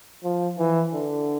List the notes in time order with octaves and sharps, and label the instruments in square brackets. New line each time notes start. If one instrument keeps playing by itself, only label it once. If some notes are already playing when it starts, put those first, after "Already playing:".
[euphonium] F3
E3
D3